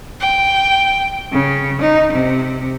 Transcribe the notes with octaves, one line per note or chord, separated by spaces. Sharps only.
G5
C#3
D#4
C3